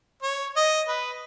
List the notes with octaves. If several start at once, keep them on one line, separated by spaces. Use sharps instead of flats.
C#5
D#5
B4